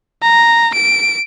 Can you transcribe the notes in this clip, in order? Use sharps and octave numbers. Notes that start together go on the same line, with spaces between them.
A#5
D7